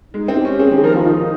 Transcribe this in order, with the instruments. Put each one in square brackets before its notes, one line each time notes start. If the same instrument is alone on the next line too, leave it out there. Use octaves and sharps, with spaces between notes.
[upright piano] G#3 [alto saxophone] D#4
[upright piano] C4
[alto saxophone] G4
[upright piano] C#4
[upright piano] C4 [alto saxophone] G#4
[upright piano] D#3 [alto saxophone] G4
[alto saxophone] G#4
[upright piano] F3 [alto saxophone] A#4
[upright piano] D#3 [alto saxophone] F4
[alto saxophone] D#4